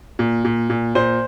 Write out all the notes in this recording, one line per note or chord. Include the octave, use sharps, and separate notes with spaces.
A#2
A#2
A#2
A#2 C5